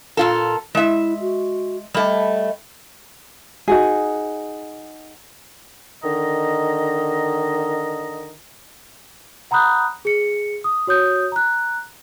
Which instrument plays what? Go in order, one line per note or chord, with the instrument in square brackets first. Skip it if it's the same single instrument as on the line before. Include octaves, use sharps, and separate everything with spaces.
[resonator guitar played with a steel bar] A#2 F4 A4
[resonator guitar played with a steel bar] G#3 E5 [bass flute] E4
[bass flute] F#4
[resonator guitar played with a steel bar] G3 A3 [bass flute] D#5
[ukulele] D#4 F#4 G#4
[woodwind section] D3 D#3 D#5 A#5
[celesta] F#5 A#5 B5 D#6 F#6 G6
G#4 C#7
D#6
F#4 C#5 D#6 G6
A#5 F#6